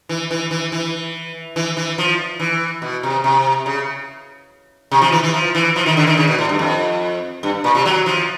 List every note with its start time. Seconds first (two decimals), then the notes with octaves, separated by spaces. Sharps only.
0.09 E3
0.31 E3
0.51 E3
0.72 E3
1.56 E3
1.77 E3
1.98 F3
2.40 E3
2.82 B2
3.03 C3
3.24 C3
3.66 C#3
4.92 C3
5.02 F3
5.12 E3
5.24 E3
5.34 F3
5.55 E3
5.76 F3
5.86 D#3
5.97 D3
6.07 D#3
6.17 C#3
6.28 B2
6.39 A2
6.49 G2
6.59 F2
7.43 G2
7.64 A#2
7.75 C3
7.86 F#3
8.06 F3